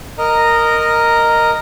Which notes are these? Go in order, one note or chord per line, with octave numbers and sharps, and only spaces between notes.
A#4 D#5 A#5